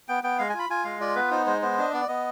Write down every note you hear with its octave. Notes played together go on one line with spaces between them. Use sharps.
B3 G5
B3 G5
G#3 F5
G#5
F4
B5
F4 G#5
G#3 F5
F4 D5
B3 B4
D#4 C5
G#3 C5
B3 C5
D4 D#5
B3 D5
B3 D#5